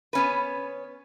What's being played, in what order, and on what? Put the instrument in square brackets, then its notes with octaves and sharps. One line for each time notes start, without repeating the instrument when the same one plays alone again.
[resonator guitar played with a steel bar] B3 C#4 B4